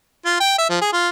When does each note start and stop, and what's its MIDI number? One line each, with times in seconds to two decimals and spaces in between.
0.25 0.39 65
0.40 0.57 79
0.58 0.68 76
0.70 0.78 53
0.81 0.92 68
0.93 1.09 65